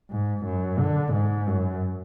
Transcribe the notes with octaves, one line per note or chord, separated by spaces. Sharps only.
G#2
F#2
D3
G#2
F#2